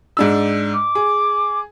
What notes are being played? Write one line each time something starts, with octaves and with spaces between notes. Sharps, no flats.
G#2 D4 E6
D6
G#4